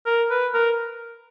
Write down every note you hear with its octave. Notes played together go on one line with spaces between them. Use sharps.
A#4
B4
A#4